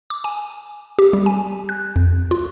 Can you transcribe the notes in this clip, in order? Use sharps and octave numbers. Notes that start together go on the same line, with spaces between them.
D6
G#5
G4
G3
G#5
F#6
F2
F4